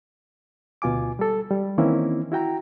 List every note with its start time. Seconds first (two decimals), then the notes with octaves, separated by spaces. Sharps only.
0.82 D2 B2 F4 G#5 D6
1.19 G3 A4
1.50 G3
1.78 D#3 E3 A#3 C4 C#4 E4
2.32 E4 F#4 G5 A#5